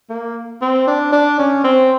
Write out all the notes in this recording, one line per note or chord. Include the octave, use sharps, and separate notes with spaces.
A#3
C4
D4
D4
C#4
C4